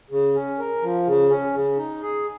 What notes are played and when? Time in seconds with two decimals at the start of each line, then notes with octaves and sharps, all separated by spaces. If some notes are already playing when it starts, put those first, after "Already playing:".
0.11 C#3
0.35 C#4
0.59 A#4
0.82 F3
1.07 C#3
1.30 C#4
1.53 C#3
1.77 D#4
2.02 G#4